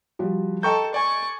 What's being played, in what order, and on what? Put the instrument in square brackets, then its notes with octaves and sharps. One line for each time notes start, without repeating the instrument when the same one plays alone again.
[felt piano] F3 G3 F#4
[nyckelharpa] A4 [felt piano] D#5 A#5 [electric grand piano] G5 C#6 G6
[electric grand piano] D5 G#5 [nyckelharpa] C#6